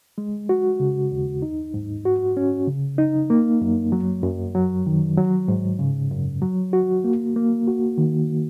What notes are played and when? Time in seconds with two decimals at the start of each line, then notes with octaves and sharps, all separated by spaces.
0.18 G#3
0.49 F#4
0.80 C#3
1.12 D#2
1.42 D#4
1.74 G#2
2.05 F#4
2.37 C#4
2.67 C#3
2.98 D#4
3.30 A#3
3.61 F#2
3.92 F#3
4.23 F#2
4.55 F#3
4.87 D#3
5.17 F#3
5.48 G#2
5.79 C#3
6.12 F#2
6.42 F#3
6.73 F#4
7.04 A#3
7.36 A#3
7.68 F#4
7.98 D#3